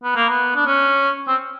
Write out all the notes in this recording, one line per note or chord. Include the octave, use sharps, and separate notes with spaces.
B3
A#3
B3
D4
C#4
C4